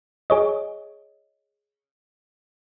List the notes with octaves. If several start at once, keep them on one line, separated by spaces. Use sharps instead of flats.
G#4 C#5 D#5